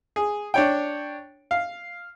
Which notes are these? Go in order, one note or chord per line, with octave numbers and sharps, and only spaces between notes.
G#4
D4 C#5 G5
F5